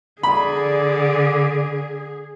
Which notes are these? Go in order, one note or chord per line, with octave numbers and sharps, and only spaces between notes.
D3 G#4 D5 B5